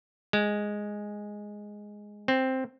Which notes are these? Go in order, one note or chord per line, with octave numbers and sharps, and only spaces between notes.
G#3
C4